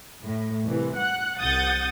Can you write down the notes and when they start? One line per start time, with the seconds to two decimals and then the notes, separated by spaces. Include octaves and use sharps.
0.24 A2
0.65 C2 E3
0.96 F#5 F#6
1.41 C2 F#5 D#6 G6 A6